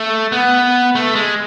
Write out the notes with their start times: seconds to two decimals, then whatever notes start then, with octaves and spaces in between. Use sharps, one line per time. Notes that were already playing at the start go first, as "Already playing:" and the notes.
Already playing: A3
0.32 B3
0.95 A3
1.15 G#3